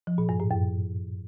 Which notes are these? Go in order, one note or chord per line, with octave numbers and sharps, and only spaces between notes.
F3
A#2
G2
A2
F#2